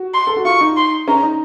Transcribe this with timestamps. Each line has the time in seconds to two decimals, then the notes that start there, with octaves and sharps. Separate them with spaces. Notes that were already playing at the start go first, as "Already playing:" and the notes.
Already playing: F#4
0.14 C6
0.27 A4
0.36 F#4
0.45 F4 C#6
0.61 D#4
0.77 C6
1.08 C#4 A#5
1.23 D#4